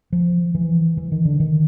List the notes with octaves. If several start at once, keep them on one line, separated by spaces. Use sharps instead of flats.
F3
E3
E3
D#3
D3
D#3